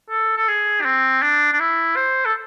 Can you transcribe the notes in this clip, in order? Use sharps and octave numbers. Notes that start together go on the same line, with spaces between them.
A4
A4
G#4
D4
C4
D4
D4
E4
C5
A4